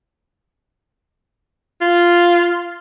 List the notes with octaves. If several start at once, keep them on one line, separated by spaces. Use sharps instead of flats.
F4